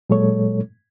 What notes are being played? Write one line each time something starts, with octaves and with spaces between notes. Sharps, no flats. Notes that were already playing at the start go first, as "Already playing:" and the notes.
A#2 F#3 G#3 A4 C#5